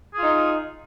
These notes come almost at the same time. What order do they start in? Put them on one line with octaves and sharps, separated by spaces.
G#4 F4 D#4